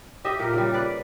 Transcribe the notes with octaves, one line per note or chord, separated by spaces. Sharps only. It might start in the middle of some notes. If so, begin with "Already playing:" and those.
G4 D#5 E5
A#2 A#4
C#3 G3
B4 D5